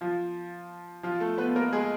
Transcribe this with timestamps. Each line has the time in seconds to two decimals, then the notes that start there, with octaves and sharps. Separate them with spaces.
0.01 F3 F4
1.03 F3 F4
1.20 A3 A4
1.38 B3 B4
1.56 A#3 A#4
1.72 G#3 G#4